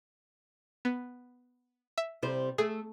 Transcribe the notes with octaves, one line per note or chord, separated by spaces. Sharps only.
B3
E5
C3 G3 C5
A3 G#4